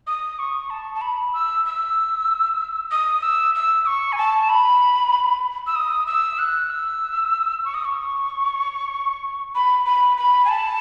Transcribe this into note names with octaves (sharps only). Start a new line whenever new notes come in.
D#6
C#6
A5
A5
B5
E6
E6
D#6
E6
E6
C#6
G#5
A5
B5
E6
D#6
E6
F#6
E6
C#6
D#6
C#6
B5
B5
B5
G#5
A5